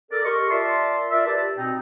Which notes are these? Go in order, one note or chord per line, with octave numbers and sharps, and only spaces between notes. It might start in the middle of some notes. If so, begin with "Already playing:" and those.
A4 A#4 D5
G4 A#4 D#5 C6 C#6
F4 A#4 D5 E5 A5 C6
F4 A#4 D5 E5
G4 B4 D5 A5
B2 C4 D#4